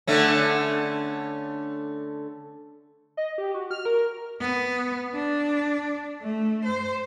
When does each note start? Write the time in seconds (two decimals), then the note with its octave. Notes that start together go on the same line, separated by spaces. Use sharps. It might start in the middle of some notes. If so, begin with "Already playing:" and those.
0.07 D3 A3 C#4
3.17 D#5
3.38 G4
3.54 F#4
3.71 F6
3.85 A#4
4.40 B3
5.14 D4
6.21 A3
6.65 C5